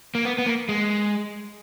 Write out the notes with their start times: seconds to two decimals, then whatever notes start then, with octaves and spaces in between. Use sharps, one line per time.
0.15 A#3
0.25 B3
0.38 B3
0.46 A#3
0.69 G#3